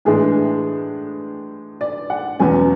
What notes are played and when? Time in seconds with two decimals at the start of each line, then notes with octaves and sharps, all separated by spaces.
0.05 A2 E3 G#3 D4 G#4
1.81 D5
2.10 F#5
2.39 E2 B2 F#3 C#4 G#5